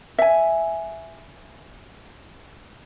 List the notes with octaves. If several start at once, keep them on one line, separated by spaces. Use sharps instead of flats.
E5 G#5